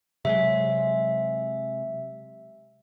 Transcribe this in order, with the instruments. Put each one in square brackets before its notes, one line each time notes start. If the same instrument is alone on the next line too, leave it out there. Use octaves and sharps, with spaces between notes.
[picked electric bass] C3 F#3 G#3 [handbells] E5